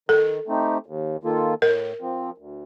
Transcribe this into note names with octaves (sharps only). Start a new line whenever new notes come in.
D#3 A4
A3 C4 D#4 G4
D#2
D#3 A#3 F4 A4
A2 A#4
F3 C4
D2